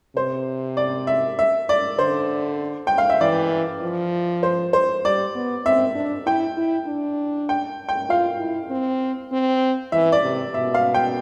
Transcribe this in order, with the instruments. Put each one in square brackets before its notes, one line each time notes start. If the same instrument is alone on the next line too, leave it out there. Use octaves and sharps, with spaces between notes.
[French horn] C3 [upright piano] C5
[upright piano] D5
E5
E5
D5
[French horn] D3 [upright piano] C5
[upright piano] G5
F5
E5
[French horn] E3 [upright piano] D5
[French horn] F3
[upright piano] C5
C5
[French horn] G3 [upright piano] D5
[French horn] B3
[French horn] C4 [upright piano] E5
[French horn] D4
[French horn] E4 [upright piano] G5
[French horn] E4
D4
[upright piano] G5
G5
[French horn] F4 [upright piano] F5
[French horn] E4
C4
C4
[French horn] E3 [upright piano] E5
[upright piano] D5
[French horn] C3
[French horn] B2 [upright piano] E5
[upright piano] F5
G5